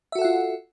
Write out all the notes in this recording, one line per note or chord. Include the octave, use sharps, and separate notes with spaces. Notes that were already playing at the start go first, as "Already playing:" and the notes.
F4 F#4 A4 E5 F#5